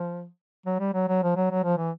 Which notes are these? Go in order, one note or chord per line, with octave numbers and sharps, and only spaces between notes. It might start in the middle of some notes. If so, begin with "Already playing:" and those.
Already playing: F3
F#3
G3
F#3
F#3
F3
F#3
F#3
F3
E3